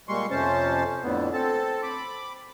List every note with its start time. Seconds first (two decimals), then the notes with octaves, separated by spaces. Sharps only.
0.08 A#2 G3 G#3 C6 C#6
0.31 F2 C3 C#4 C5 A5
1.03 F2 A2 D3 B3
1.33 C4 A4 A5
1.83 B5 D6